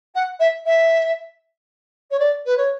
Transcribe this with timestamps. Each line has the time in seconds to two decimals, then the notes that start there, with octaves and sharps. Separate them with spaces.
0.15 F#5
0.39 E5
0.65 E5
2.10 C#5
2.19 D5
2.45 B4
2.57 C#5